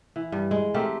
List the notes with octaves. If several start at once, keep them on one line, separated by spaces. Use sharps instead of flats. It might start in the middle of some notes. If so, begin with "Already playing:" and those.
E3
G2
G#3
A3 C4 G4 A#4